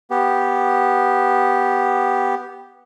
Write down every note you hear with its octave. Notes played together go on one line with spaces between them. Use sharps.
B3 G4